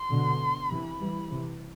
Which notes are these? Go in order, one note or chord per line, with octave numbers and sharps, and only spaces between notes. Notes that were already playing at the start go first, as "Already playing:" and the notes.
Already playing: C6
B2 D3
C3 E3 B5
E3 G3
C3 E3